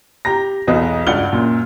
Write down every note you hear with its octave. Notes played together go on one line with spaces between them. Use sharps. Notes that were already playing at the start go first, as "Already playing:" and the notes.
G4 A#5 A#6
B1 E2 B3 F#4 D#5
C#2 G2 D5 F#5 F6 G7
F#2 A#2